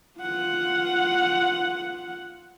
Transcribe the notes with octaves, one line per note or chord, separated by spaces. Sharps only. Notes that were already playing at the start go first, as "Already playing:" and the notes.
F4 F#5